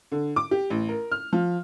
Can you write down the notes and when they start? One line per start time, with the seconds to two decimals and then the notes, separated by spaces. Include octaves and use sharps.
0.12 D3
0.36 D6
0.51 G4
0.70 A1
0.89 A#4
1.12 F6
1.33 F3